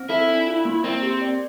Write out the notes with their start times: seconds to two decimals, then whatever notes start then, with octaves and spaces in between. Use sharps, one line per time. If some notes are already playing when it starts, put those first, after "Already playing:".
Already playing: C4
0.09 E4 A4
0.28 D4
0.47 F4
0.65 A#3
0.84 C4 A#4
1.02 G4
1.21 D5